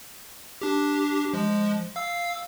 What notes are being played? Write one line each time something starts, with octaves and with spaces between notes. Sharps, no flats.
D4 G4
F3 G#3
F5 E6